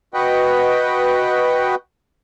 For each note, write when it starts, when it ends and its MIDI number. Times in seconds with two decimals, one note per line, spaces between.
0.14 1.75 66
0.14 1.75 71
0.14 1.75 75
0.14 1.75 78
0.14 1.75 79